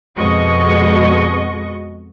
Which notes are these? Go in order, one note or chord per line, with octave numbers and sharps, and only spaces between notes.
F2 B2 G#3 F#4 D#5 C#6